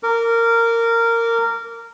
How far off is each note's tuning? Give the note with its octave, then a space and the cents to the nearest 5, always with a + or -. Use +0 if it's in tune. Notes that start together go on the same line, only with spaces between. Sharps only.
A#4 -15 D6 -25